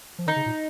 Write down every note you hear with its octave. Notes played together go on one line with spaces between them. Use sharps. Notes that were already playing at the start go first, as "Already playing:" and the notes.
F3
D#3 D#4
C#3
A#2